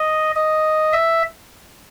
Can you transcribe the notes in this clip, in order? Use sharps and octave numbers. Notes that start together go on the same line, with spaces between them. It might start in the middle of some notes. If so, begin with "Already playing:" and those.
Already playing: D#5
D#5
E5